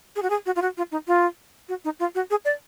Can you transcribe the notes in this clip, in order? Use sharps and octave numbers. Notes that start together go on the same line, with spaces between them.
G#4
F#4
G#4
F#4
F4
F#4
F4
D#4
F4
F#4
D#4
F4
F#4
G#4
D5